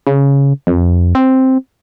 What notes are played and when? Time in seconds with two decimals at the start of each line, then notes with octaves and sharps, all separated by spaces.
0.07 C#3
0.67 F2
1.15 C4